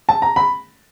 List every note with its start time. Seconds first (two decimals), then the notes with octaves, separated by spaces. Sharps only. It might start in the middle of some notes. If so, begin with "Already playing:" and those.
0.09 A5
0.22 A#5
0.36 B5